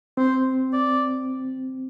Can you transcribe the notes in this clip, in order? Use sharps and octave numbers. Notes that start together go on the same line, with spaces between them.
C4 C5
D5